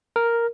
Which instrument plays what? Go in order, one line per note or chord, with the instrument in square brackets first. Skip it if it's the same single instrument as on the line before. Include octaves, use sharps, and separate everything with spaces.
[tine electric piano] A#4